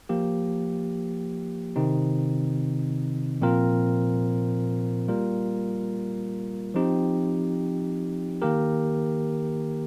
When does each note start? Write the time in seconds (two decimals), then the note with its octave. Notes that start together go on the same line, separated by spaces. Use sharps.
0.09 F3 A#3 G4
1.76 C3 D#3 C4 D#4
3.41 A#2 F3 C4 F4 A#4
5.08 G3 A#3 F4 A#4
6.74 F3 C4 D#4 G4
8.42 D#3 A#3 G4 A#4